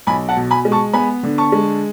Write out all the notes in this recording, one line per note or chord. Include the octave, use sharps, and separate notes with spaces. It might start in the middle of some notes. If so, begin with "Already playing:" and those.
B1 G#5 B5
F#5 A5
B2
G#5 B5
G#3
A5 C#6
B3 G#5 B5
D3
A5 C#6
G#3